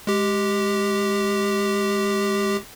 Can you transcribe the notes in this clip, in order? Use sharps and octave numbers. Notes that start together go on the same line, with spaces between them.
G#3 G4